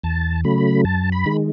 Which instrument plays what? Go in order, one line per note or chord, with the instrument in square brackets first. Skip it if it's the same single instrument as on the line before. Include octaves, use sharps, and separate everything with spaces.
[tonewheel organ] E2 A5
C#3 F#3 A3 B5
F#2 A5
B5
D#3 G#3